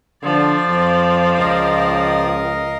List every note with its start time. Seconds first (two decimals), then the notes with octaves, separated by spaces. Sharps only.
0.23 D3 F3 D5
0.68 F2
1.38 C#2 A#4 D#5 F5